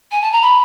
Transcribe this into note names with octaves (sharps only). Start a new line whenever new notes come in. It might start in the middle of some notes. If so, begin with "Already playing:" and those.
G#5
A5
A#5
B5